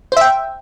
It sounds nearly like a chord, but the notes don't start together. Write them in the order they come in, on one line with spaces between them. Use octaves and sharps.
C5 E5 G5